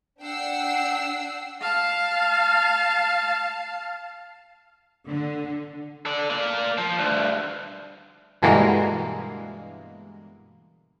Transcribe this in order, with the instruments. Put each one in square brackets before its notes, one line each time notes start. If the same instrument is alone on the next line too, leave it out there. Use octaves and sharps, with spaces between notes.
[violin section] D4 F#5 G5 E6 C7
[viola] F5 A5
[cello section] D3
[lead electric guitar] A4 D5
A#3 D5
F3
D2 G2
[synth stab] G2 B2 D3 E3 G#3 A#3